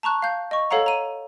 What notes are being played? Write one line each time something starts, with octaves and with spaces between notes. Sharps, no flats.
A5 A#5 C#6 F#6
F5 G6
D#5 C#6
A4 C#5 F5 F#5 A#5
A#5 D#7